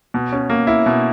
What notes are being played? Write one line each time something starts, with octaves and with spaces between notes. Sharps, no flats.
B2
C#4
A#3
E4
B2